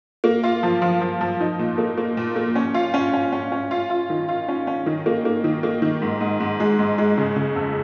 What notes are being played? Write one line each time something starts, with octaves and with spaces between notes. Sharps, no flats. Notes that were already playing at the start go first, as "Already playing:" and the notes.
A#3
F4
F3
F3
F3
F3
D#4
A#2
A#3
A#3
A#2
A#3
C#4
F4
C#4
C#4
C#4
C#4
F4
F4
D#3
F4
C#4
C#4
D#3
A#3
A#3
D#3
A#3
D#3
G#2
G#2
G#2
G#3
G#2
G#3
C#3
C#3
F2